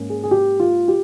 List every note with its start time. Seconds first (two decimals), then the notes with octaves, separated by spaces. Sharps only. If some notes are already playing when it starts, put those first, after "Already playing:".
Already playing: G#2 A#3 C#4
0.10 G#4
0.23 G#4
0.31 G4
0.60 F4
0.88 G4